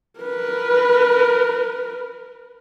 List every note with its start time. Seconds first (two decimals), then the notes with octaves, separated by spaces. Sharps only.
0.20 A#4 B4